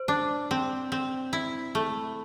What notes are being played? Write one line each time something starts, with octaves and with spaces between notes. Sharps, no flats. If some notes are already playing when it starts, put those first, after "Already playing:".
Already playing: C5
D4
C4
C4
E4
A3